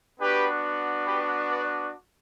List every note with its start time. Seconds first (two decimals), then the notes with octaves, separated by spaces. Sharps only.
0.19 B3 D4 F#4 G4 B4
1.06 G4 B4
1.49 B4 D5